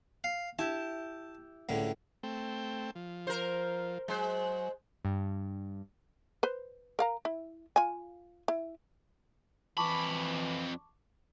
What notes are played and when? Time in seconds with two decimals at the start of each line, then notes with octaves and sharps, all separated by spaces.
0.24 F5
0.59 E4 G4 A5
1.69 C#2 A2 D3
2.23 A3 C4 G5
2.95 F3
3.27 A#4 C5
4.08 F#3 G#3 C5
5.05 G2
6.43 B4 C5
6.99 A#4 F5 A#5
7.25 E4
7.76 F4 G#5
8.48 E4
9.78 F2 E3 A5 B5 C#6 D6